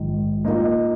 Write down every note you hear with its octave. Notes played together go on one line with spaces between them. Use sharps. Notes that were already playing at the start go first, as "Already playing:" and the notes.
Already playing: A#1 G#2 D#3
A#2 A#3 D#4 A#4 D#5